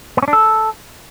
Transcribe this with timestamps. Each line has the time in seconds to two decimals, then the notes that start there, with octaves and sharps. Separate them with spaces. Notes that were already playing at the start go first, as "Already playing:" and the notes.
0.17 B3
0.22 C#4
0.28 D4
0.33 A4